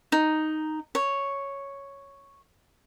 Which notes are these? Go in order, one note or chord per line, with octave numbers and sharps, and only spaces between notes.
D#4
C#5